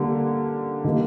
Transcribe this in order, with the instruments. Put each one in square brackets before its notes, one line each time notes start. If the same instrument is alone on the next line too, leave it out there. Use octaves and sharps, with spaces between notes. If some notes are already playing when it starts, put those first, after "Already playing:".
Already playing: [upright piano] D3 G3 A#3
D#3 G3 A#3